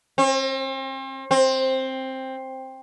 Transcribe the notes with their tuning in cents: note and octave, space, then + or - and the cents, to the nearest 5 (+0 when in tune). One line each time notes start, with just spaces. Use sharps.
C4 +40
C4 +10